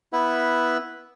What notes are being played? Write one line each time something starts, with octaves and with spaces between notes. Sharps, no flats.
B3 E4 B4 E5 F#5